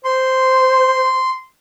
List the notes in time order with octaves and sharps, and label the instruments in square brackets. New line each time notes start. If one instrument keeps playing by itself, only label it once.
[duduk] C5 [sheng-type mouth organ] C6